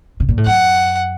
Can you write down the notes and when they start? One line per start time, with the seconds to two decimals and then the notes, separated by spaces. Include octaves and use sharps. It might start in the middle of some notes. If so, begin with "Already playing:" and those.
0.20 C3
0.29 A#2
0.37 A2
0.46 F#2 F#5